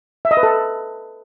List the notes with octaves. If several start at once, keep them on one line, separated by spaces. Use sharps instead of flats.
E5
D#5
B4
A4